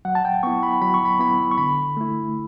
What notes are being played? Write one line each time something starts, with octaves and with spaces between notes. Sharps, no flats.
F#3 F#5
A5
G5
B3 E4 C#6
B5
F#3 B5
C#6
B5
B3 E4 B5
C#6
D3 B5
A3 E4